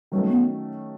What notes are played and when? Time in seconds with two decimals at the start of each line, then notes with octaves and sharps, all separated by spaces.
0.12 D#3 F#3 G3 A3 C#4
0.29 B3